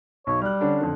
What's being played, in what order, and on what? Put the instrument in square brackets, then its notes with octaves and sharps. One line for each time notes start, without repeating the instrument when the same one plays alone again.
[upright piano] B1 [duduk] C#5
[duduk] G3 [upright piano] F6 F#6
[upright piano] D3 C#4 D4
F2 D3